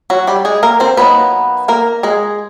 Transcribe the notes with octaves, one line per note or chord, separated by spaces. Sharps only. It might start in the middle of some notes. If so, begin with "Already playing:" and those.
F#3 F#4
G3 G4
G#3 G#4
A#3 A#4
C4 C5
F#3 A#3 B3 D#4 B4
A#3 A#4
G#3 G#4